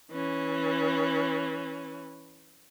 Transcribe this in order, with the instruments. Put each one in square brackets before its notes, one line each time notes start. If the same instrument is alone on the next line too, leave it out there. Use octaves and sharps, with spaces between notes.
[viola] E3 C#4